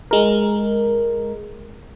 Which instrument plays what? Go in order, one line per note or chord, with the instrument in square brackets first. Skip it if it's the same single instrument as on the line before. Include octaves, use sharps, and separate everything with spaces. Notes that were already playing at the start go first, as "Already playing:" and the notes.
[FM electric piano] G#3 A#4